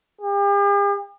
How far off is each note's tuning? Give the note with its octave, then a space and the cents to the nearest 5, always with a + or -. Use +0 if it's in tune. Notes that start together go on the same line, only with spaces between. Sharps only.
G4 +45